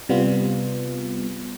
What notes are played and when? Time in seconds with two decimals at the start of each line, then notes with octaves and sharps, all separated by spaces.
0.09 C3 G3 B3 F4